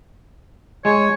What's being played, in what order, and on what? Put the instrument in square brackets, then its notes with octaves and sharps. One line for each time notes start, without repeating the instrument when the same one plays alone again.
[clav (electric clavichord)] G#3 [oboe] C#5